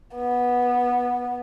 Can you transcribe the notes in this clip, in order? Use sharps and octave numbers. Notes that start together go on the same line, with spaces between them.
B3